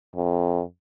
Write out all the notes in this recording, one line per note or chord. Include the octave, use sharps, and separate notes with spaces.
F2